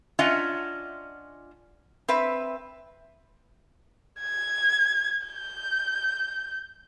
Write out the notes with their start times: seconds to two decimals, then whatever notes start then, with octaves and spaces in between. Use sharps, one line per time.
0.19 C#4 D4 F4 D#5 E5 F#5
2.08 C4 B4 E5
4.20 G#6
5.27 G6